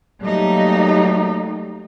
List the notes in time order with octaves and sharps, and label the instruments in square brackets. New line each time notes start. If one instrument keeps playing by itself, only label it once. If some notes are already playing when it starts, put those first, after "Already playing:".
[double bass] F#3 A3 [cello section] G3 A#3 D#4